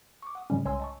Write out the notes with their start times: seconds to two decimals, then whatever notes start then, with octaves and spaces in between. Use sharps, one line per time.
0.22 C#6 D6
0.35 F#5 D#6
0.50 G#2 C#3 G3 G#3 C#4
0.65 C2 C#5 G#5 C6 E6
0.80 D#5 A5 C#6